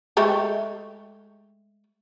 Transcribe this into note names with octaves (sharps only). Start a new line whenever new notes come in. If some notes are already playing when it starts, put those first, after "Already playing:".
G#3 A3 G4